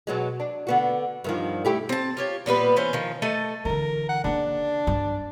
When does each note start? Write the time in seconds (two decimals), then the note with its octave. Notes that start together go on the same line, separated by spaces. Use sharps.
0.07 B2 F#3 G#3
0.40 D4
0.67 D3 B3 F#4
1.24 G2 D#3 F3
1.65 A3 E4 G4
1.89 C4 A5
2.17 F4 G4 C#5
2.46 A#2 G3 B3 B4
2.76 E3 B3 C#4 C5
2.93 D#3 F3
3.22 A3 A4 D#5 A5
3.65 D3 E3 A#4
4.09 F#5
4.24 C#3 A#3 D4
4.87 G2